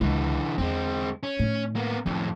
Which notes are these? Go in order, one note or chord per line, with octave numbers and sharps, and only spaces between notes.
C#2 D3 E3 G#3
E2 D3 G#3 C4
C#4
A2 D#3
A#3 B3
F2 A2 D#3 C#4